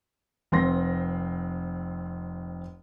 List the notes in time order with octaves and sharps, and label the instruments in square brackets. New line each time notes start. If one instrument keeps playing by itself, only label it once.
[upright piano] F1 C4 C6 A#6